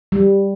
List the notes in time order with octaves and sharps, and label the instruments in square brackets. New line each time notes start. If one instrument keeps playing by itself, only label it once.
[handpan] G3